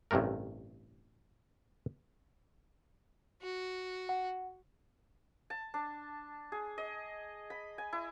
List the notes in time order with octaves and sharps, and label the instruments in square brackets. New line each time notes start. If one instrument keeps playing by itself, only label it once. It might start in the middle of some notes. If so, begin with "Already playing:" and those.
[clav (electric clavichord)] A1 G2 C3 A3 A#4
[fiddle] F#4
[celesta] F#5
[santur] A5
D4
G#4
D#5
B5
G#5
E4